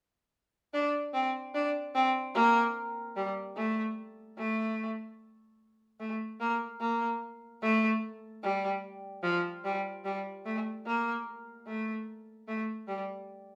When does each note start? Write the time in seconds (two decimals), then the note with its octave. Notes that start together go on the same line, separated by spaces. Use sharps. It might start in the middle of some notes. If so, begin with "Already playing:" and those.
0.74 D4
1.13 C4
1.55 D4
1.95 C4
2.35 A#3
3.16 G3
3.56 A3
4.38 A3
6.00 A3
6.40 A#3
6.80 A#3
7.62 A3
8.43 G3
9.23 F3
9.65 G3
10.05 G3
10.45 A3
10.86 A#3
11.66 A3
12.48 A3
12.88 G3